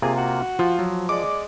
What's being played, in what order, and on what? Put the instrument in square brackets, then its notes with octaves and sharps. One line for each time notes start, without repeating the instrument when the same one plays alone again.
[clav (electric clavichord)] C3 A#3 F4 [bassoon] G#4
[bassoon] F#4
[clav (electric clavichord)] F3 [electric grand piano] F4
[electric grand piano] F#3
[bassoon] G#3 [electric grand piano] D5 D6